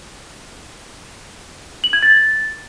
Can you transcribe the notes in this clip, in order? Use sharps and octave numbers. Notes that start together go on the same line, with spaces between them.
F#7
G#6
A6